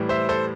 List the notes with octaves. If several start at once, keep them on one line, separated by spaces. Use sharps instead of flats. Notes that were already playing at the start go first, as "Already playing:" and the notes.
Already playing: A2 E3 G3
C5 E5
A4 C5